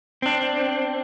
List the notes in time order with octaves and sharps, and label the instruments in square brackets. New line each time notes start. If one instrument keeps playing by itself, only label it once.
[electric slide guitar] C4 D4